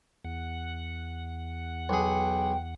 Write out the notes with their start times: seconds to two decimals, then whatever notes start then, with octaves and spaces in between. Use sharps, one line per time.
0.25 E2 F#5
1.89 B1 G#4 G5